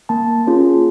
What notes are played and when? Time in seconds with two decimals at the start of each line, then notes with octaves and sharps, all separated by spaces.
0.09 A#3 A5
0.47 C#4 F4 G#4